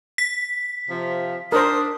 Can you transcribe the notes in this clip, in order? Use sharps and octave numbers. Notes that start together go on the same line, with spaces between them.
B6
C3 F3
D4 A#4 C5 D#6